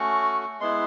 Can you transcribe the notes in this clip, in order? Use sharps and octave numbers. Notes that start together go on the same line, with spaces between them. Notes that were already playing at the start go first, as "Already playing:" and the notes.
Already playing: A3 C#4 F#4 C#6
G#3 B3 E4 C6